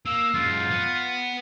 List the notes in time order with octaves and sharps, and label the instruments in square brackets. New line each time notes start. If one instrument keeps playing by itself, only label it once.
[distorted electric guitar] A#3 [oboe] E6
[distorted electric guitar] F#2 G#3 [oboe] F4
[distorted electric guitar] B3